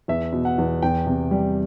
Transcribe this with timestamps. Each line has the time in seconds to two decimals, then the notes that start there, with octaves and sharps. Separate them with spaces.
0.08 E2 E5
0.33 B2
0.45 F#5
0.58 E2
0.82 E2 G5
1.06 C3
1.31 G3